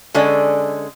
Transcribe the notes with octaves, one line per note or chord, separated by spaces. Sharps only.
D3 G#3 C#4 A4 D5 D#5